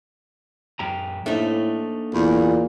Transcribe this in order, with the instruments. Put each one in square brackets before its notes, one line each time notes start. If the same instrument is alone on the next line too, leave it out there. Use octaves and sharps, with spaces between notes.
[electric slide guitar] F#2 G4 A#5
[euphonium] A2 [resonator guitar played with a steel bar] A3 D#4 [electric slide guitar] A#3 D4 C5
[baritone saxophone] E2 [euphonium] A#2